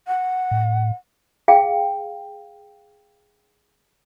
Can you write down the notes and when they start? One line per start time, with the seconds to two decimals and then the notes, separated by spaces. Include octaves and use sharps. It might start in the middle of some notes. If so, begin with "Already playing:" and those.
0.07 F#5
0.51 A2
1.48 G#4 F5 G5